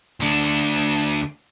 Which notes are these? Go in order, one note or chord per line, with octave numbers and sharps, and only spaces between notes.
D2 D4